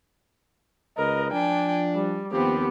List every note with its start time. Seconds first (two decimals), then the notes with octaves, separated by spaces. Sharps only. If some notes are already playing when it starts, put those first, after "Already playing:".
0.97 C#2 A#4 B4 D#5
1.32 F3 D4 G5 G#5
1.95 G3
2.32 D#2 F3 B3 C4 G4